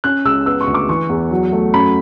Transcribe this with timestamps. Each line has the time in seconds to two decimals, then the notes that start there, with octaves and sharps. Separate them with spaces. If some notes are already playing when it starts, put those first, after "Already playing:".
0.04 C#4 F#6
0.25 C#2 E6
0.46 B3 E6
0.61 C#6
0.67 D2
0.74 D6
0.88 E3 C#6
1.09 E2
1.31 F#3
1.52 A3
1.73 F#2 B5